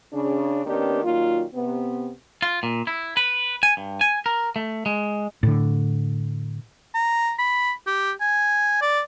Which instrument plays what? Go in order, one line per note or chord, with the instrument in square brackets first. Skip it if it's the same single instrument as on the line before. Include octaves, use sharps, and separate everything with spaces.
[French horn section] C#3 D4
D#3 A#3 B3 C#4 D4 G4
A#2 D#3 F#3 A#3 F4
C3 B3
[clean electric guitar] F4
A#2
E4
B4
G#5
G2
G#5
A#4
A3
G#3
[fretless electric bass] A2 D3
[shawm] A#5
B5
G4
G#5
D5